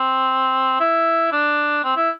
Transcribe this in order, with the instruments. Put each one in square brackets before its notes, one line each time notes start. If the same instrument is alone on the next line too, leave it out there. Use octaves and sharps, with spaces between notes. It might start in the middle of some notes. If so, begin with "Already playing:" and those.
Already playing: [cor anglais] C4
E4
D4
C4
E4